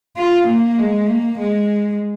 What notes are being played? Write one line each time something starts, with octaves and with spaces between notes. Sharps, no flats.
F4
A#3
G#3
A#3
G#3